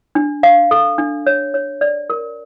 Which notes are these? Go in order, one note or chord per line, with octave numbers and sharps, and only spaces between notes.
D4
F5
A4
D4
C#5
C#5
D5
A#4